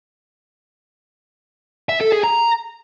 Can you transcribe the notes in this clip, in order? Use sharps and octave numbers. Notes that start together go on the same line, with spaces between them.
E5
A4
G#4
A#5